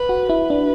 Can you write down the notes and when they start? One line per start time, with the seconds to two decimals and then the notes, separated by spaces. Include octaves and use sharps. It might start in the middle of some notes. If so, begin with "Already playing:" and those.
Already playing: B4
0.09 F#4
0.30 E4 B4
0.50 D4